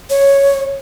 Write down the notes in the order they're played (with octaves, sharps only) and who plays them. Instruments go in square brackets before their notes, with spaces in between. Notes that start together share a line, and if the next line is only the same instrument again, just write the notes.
[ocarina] C#5